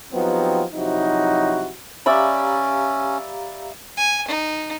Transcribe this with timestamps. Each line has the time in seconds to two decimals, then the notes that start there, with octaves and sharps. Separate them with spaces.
0.13 F3 F#3 B3 C4 D#4 G4
0.73 C3 F3 F#3 D#4 E4 F#4
2.06 C#4 G4 D5 E5 F5 A#5 B5
3.97 G#5
4.28 D#4